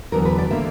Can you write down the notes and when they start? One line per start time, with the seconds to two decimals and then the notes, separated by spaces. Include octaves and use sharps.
0.12 E2 D3 F#3 A#4
0.25 B4
0.38 D5
0.51 D3 A#3 E5